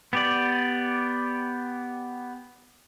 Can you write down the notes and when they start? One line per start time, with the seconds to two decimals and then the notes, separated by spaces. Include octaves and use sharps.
0.13 B3 G4 D5